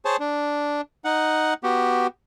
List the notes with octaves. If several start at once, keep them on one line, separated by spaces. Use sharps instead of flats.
G#4 C5 C#5 A5
D4
D#4 F#5
B3 F#4 G4